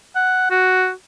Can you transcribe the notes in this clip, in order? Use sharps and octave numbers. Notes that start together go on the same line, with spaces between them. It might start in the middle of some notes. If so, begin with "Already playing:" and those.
F#5
F#4